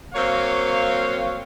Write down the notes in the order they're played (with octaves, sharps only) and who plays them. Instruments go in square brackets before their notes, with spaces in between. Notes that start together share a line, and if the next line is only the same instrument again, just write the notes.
[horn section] F#3 A#3 C4 C#5 F5